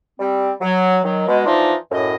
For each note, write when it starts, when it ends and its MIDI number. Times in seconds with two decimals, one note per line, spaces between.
0.19 0.51 55
0.19 0.51 60
0.61 0.99 54
1.03 1.24 51
1.03 1.24 54
1.27 1.44 47
1.27 1.44 56
1.45 1.74 52
1.45 1.74 53
1.45 1.74 62
1.45 1.74 63
1.45 1.74 65
1.91 2.15 42
1.91 2.15 45
1.91 2.15 75